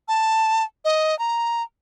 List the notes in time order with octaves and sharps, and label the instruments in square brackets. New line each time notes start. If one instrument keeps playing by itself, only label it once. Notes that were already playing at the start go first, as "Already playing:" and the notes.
[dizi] A5
D#5
A#5